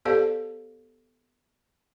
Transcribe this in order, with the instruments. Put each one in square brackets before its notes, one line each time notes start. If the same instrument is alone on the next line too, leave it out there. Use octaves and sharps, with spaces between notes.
[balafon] B3 G4 A4 C5 D5 F5